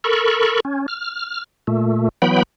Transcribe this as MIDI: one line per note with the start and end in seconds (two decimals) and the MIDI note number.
0.04 0.60 69
0.04 0.60 70
0.04 0.60 83
0.04 0.60 85
0.65 0.86 61
0.88 1.44 89
1.67 2.09 46
1.67 2.09 57
2.22 2.43 52
2.22 2.43 54
2.22 2.43 59
2.22 2.43 79
2.22 2.43 83